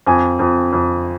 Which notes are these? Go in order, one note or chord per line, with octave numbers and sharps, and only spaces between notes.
F2 G#5
F2
F2